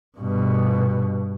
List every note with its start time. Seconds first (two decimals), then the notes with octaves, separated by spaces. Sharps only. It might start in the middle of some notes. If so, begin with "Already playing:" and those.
0.18 G2 B2